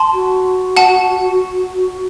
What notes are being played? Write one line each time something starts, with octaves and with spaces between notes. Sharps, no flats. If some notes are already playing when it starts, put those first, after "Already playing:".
Already playing: A5 C6
F#4
F#5 A5